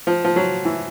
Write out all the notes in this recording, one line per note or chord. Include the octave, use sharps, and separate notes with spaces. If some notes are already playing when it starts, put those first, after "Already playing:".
F3
F3
F#3
E3